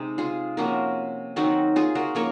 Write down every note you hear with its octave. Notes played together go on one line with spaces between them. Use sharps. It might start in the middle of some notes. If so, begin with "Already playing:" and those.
Already playing: C3 G#3 D#4
F4 G#4
C3 F3 A#3 C#4 F#4 A#4
D#3 F#3 C4 D#4 F#4 A#4
F4 G#4
F#4 A#4
F3 A#3 C#4 A#4 C#5